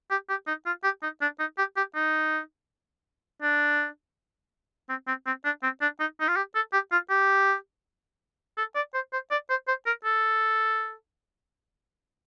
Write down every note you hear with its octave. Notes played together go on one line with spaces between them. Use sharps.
G4
G4
D#4
F4
G4
D#4
D4
D#4
G4
G4
D#4
D4
C4
C4
C4
D4
C4
D4
D#4
D#4
F4
G4
A4
G4
F4
G4
A4
D5
C5
C5
D5
C5
C5
A#4
A4